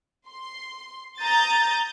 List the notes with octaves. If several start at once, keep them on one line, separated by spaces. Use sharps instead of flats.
C6
A#5 D#6 G6 A6